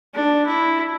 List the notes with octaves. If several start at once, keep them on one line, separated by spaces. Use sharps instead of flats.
D4
E4